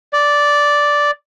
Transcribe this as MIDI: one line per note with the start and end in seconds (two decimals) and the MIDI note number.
0.13 1.11 74